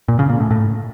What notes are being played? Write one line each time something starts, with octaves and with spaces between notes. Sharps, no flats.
A#2
C#3
A#2
A2
A2